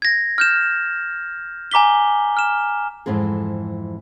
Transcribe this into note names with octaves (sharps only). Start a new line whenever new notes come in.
G#6 A#6
F6 G6 E7
G#5 A#5 D6 B6 G7
F6 E7
F2 G#2 E3 C4 G#4